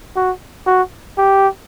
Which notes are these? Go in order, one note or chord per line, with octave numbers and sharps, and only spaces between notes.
F#4
F#4
G4